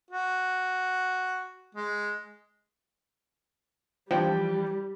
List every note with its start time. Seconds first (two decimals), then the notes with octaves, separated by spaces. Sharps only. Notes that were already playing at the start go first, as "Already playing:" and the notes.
0.11 F#4
1.75 G#3
4.11 E3 F3 G3 D4 G5